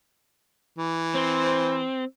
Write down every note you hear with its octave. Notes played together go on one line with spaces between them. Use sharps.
E3
C4 C5